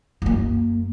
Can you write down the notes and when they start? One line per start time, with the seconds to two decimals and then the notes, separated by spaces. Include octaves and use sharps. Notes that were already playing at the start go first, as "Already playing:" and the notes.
0.22 F#2 A#3